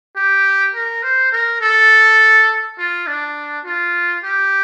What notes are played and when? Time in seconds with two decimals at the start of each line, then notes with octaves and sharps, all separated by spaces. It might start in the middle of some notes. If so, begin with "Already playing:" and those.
0.16 G4
0.74 A#4
1.03 C5
1.32 A#4
1.61 A4
2.78 F4
3.07 D4
3.65 F4
4.23 G4